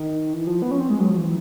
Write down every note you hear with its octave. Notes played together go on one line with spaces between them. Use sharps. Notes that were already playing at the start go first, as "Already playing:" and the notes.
Already playing: D#3
E3
F3
B3
C#4
C4
G#3
F#3
F3
E3